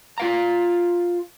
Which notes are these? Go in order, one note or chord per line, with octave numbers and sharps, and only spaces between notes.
F4 F5 A#5